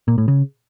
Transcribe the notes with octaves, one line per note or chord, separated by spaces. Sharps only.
A#2
A2
C#3